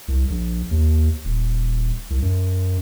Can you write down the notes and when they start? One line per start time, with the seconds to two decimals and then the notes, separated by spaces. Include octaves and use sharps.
0.08 C2
0.30 A#1
0.71 D#2
1.25 D#1
2.10 C2
2.22 F#2